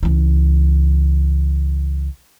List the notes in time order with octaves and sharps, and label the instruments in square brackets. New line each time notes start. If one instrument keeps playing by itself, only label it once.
[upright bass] C#2 E3